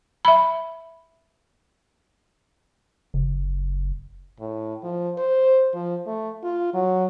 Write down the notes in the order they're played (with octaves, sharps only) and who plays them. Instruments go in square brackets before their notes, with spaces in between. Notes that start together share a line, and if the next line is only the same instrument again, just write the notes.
[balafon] E5 B5
[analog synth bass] F#1
[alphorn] A2
F3
C5
F3
A3
F4
F#3